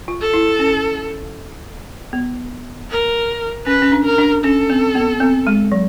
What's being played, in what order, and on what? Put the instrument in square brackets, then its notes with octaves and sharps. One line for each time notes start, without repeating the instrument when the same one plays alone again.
[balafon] F4
[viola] A4
[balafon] E4
C#4
B3
[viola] A#4
[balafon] C#4 [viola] B4
[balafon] C#4
D4
[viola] A#4
[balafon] D4
[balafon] C#4 [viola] A4
[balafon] C4
B3
C4
G#3
F#3